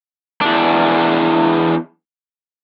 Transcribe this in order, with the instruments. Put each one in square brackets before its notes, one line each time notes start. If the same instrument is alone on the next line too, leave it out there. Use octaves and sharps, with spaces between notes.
[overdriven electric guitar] E2 D4